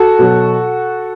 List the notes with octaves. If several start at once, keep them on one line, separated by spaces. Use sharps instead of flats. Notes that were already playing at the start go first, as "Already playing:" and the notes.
Already playing: F#4 A4
B2 F#3